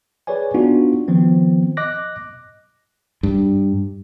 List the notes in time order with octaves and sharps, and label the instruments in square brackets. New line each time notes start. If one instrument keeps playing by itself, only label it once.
[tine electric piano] G#4 B4 C#5 D5 G#5
B3 D4 D#4 F4 F#4
D#3 F3 B3 C4
D#5 D6 F#6 A#6
[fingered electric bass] G2